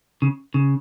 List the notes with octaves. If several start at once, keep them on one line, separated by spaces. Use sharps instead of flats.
C#3
C#3